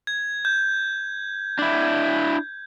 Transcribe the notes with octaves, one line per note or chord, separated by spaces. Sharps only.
G#6
G6
D4 E4